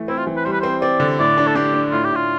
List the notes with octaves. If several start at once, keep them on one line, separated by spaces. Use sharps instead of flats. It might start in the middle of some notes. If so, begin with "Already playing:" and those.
Already playing: E3 A3
C4 E4
F4
E3
B4
G3 C5
B4
C4 C5
C4 D5
D3
A2 D5
D4
A4
D4 G4
D4
A2 F4
G4
A2 F4